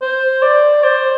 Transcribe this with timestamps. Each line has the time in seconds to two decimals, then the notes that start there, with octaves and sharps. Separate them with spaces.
0.02 C5
0.42 D5
0.84 C5